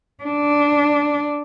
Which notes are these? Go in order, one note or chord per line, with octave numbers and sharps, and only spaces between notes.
D4